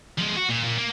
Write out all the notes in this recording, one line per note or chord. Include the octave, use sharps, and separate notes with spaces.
F3 G#3
F#4
A#2
A#2
A#3